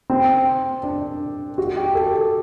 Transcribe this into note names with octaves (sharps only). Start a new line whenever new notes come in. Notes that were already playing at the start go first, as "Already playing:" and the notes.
C4
D4
F#4
G4
A4